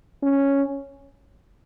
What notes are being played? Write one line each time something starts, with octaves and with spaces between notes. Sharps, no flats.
C#4